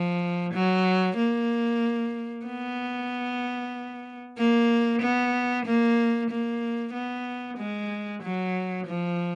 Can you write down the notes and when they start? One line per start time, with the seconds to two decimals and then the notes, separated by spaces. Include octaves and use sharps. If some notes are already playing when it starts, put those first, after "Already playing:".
Already playing: F3
0.54 F#3
1.16 A#3
2.46 B3
4.38 A#3
5.01 B3
5.65 A#3
6.30 A#3
6.93 B3
7.57 G#3
8.22 F#3
8.86 F3